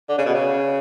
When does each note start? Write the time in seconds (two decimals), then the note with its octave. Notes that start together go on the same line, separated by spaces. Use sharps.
0.09 D3
0.18 C#3
0.26 B2
0.34 C#3